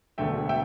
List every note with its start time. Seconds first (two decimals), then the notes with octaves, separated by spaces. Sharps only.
0.18 E1 D2 D3 A3 E5 G5
0.49 E5 G5